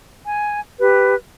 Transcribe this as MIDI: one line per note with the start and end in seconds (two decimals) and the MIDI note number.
0.25 0.61 80
0.79 1.15 67
0.79 1.15 71